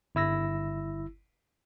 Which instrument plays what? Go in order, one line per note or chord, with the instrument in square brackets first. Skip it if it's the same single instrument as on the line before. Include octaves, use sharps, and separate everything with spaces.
[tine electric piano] G1 E4 E6 A#6